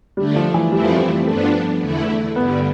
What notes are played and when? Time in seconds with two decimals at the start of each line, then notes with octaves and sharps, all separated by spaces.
0.17 D3 G3 A3 D4
0.36 F3
0.54 E3
0.72 F2 E3 G3 A3 C4 E4
0.84 F3
0.96 G3
1.26 G2 F3 A3 B3 D4
1.81 E2 D3 A3 E4
2.36 G2 D3 G3 B3